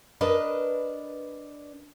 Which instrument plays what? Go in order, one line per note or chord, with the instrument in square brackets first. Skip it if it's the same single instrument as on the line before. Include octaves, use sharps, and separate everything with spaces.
[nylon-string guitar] D4 A#4 B4 D#5